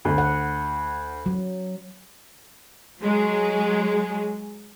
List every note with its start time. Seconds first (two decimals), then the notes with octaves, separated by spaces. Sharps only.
0.05 D2
0.18 F#5
1.26 F#3
3.02 F#3 G#3 G#4